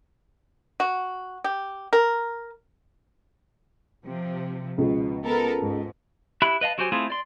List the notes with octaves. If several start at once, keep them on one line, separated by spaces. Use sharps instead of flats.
F#4
G4
A#4
C3 F3
C#2 B2
B3 A4 A#4
G#2
E4 G4 E5 B5 F#6
B4 D#5 F5 A5
F#3 F#4 G4 C5 G#5
A3 C4 E4 F4 G#4
D5 C6